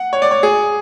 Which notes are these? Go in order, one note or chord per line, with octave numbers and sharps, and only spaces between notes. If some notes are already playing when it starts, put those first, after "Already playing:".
Already playing: F#5
C#5
D5
C#5
G#4